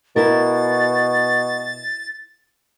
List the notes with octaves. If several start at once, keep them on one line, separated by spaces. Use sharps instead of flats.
B2 E4 A#4 A6